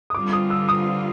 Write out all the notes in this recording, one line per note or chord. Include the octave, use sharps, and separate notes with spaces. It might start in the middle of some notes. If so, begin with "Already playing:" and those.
D#6
D3 G3 C4 F4 D6
D#6
E6
D#6